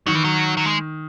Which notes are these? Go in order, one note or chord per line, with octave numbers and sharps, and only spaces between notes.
D#3 F#3
E3
F#3
F#3
G#3